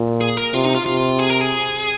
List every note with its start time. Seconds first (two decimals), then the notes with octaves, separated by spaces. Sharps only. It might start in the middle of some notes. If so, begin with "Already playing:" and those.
Already playing: A#2
0.21 G#4
0.37 A#4
0.53 C3 F4
0.65 D#4
0.75 F4
0.86 C3 F4
1.19 G#4
1.30 A#4
1.41 G#4